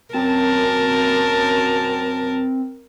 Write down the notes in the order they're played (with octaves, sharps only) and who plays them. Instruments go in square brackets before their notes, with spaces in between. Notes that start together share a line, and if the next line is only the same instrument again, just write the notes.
[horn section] F#2 A5 [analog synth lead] C4 [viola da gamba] A#4